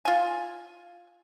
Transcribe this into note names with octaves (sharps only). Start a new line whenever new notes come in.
F4 G#5